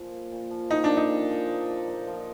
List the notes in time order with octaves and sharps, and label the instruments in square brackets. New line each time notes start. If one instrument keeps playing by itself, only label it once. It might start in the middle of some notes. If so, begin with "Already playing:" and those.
Already playing: [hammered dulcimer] A#2 F3
A#3
A#2
F3
[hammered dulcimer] A#2 [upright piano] D#4
[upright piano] D4
[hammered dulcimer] A#3
[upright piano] D#4
[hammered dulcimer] A#2
F3
A#2
A#3
A#2
F3